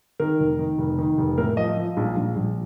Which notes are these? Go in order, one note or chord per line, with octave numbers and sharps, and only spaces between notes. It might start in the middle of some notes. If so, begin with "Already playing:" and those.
D#3 A#4
F1
D#3
F1
D#3
F1
A2 A#4
F3 D#5
F3
A#1
A#1
A#1